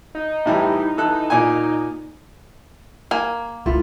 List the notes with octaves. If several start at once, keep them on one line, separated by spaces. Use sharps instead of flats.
D#4
A2 E3 G3
E3 A4 F#6
A#2 G#5
A#3 A#4 G#5
C#2 E3 E4 F4 A4